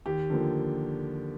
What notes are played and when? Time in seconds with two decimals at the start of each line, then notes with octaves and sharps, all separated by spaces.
0.06 D#2 G4
0.30 D3 F3 A#3